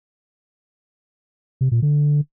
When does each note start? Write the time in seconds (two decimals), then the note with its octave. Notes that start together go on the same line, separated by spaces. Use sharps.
1.61 C3
1.72 A#2
1.82 D3